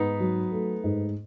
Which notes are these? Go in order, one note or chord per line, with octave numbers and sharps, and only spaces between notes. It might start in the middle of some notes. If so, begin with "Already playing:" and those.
Already playing: G#2 B3 D#4
F#3
A3
G#2